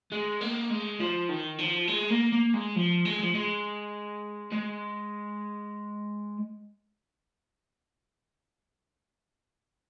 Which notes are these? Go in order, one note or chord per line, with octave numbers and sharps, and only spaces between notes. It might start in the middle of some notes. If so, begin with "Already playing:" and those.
G#3
A#3
G#3
F3
D#3
F3
G#3
A#3
A#3
G#3
F3
G#3
F3
G#3
G#3